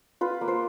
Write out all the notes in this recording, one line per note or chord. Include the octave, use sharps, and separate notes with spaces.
F4 B4
A#3
C5